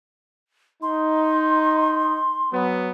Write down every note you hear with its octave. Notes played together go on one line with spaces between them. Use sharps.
D#4 C6
F#3 B3